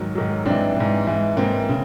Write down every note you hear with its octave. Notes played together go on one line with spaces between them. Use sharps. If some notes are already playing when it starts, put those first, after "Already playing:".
Already playing: G#2 D#3 F#3
G#2 D#3 F#3
G#2 E3 C4 D4
G#2 E3
G#2 E3
G#2 E3 A#3 C4
C#3